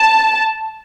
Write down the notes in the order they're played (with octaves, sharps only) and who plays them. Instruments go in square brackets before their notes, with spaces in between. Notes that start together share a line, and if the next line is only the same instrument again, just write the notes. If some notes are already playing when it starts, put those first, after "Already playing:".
Already playing: [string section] A5